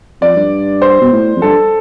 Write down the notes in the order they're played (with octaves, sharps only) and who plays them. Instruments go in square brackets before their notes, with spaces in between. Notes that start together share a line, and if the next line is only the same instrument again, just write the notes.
[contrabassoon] F2 [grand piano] D5
[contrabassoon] G2
[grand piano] C5
[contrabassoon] B2
A2
F2
[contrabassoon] G2 [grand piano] A4